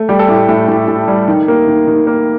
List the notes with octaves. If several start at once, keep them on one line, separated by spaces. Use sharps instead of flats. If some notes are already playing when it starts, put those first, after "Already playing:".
Already playing: A3
G3 G4
A4
A2 G4
A2
A2
A2
G3
D#3
A#3
D#3
D#3
A#3